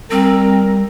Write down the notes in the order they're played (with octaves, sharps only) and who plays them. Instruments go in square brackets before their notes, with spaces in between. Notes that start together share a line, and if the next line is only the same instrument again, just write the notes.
[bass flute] G3 [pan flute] C4 [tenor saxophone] A#4